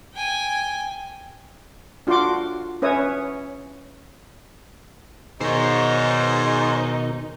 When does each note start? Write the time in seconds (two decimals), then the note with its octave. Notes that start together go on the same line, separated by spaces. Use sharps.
0.14 G5 G#5
2.07 D4 F4 F#4 F#5 C6 D6
2.82 C#4 B4 C#5 E5 D#6
5.41 G#2 B2 D#3 D#4 C5 C#5